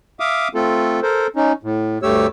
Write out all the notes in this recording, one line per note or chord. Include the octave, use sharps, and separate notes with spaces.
E5 F5 D6 D#6
A3 C4 F4 A4
A4 A#4 C5
C#4 D#4
A2
D2 G2 A3 G4 C#5 E6